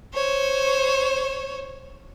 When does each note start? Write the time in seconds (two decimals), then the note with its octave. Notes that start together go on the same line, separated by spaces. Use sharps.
0.14 C5 C#5